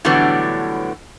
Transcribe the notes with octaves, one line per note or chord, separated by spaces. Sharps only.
A2 D3 E3 F#3 G3 B3